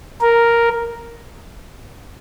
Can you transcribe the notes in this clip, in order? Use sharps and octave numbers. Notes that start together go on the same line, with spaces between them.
A#4